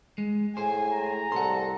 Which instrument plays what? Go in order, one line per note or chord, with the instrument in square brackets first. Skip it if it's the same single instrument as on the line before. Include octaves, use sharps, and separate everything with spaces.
[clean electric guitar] G#3
[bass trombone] A2 [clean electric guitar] G#4 C5 [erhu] G#5
[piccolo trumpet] A#5
[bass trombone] C2 [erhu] A4 [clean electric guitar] F#5 C6